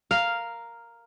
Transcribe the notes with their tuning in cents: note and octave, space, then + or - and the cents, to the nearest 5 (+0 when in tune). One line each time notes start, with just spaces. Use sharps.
A#4 +0 F5 -5